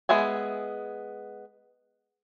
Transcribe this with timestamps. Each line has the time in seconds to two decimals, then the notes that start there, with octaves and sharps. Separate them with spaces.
0.09 G#3 B3 E5 G#5